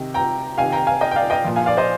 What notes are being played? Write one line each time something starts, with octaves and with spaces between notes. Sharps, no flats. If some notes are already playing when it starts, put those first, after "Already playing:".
Already playing: C3 D#3
G5 A#5
C3 D#3 F5 G#5
G5 A#5
F5 G#5
D#5 G5
G5
D5 F5
D#5 G5
A#2 F3
F5 G#5
D5 F5
C5 D#5